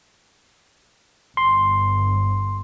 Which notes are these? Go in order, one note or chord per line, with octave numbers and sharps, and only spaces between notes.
G1 C6